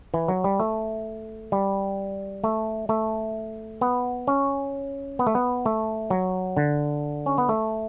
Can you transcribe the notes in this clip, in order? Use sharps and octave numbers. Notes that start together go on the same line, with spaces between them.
E3
F#3
G3
A3
G3
A3
A3
B3
C#4
B3
A3
B3
A3
F#3
D3
C#4
B3
A3